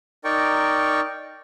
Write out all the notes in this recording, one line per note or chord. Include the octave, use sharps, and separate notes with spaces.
D#4 A#4 D5 G5 C#6